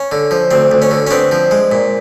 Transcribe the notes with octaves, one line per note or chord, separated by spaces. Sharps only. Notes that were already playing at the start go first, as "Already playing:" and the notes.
Already playing: C#4
D3
F3
D2 C4
D2
C#4
D3
C#4
B3 C4 D4
F3
G#3
A#2